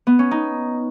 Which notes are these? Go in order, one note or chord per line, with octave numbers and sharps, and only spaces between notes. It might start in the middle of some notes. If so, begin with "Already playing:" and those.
B3
C#4
D#4